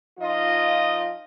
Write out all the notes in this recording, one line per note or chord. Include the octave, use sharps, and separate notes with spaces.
F3 D#4 F4 D#5